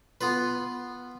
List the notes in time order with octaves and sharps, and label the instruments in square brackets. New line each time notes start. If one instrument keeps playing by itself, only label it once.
[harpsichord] B3 F4 B4